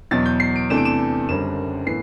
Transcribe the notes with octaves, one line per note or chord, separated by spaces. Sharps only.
E2 B2 F#3 A6
G6
C7
D7
E2 C3 E3 A3 D4 E7
D7
E7
F#1 F#2 D3 G3 C4 E7
A2 E3 B3 C7